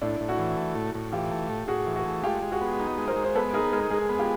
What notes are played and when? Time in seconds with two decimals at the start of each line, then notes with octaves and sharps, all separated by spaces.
0.02 A2 D4 E4
0.20 A2
0.29 E4 F#4
0.39 E3
0.57 A3
0.76 A2
0.94 A2
1.12 E3 F4 G4
1.31 A3
1.50 A2
1.68 A2 F#4 G#4
1.87 E3
1.96 F#4 G#4
2.05 A3
2.23 G#3 F4 G4
2.42 G#3
2.52 F#4 G#4
2.61 B3
2.80 D#4
2.98 G#3
3.08 A#4 C5
3.16 G#3
3.24 C5
3.35 B3 A4 B4
3.54 D#4 G#4 A#4
3.72 G#3 G#4 A#4
3.90 G#3 G#4 A#4
4.09 B3
4.19 F4 G4